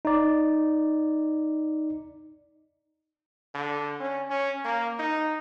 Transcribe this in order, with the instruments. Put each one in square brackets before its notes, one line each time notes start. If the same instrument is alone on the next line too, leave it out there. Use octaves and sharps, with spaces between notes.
[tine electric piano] D#4 D5
[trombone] D3
C#4
C#4
A#3
D#4